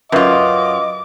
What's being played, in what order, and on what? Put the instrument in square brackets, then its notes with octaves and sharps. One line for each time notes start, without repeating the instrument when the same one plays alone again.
[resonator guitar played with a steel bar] F#2 F4 [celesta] A#4 B4 E5 [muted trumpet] D#5 [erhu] D6